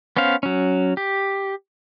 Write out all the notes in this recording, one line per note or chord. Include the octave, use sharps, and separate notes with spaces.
B3 C#4 C5 F5
F#3 C#4
G4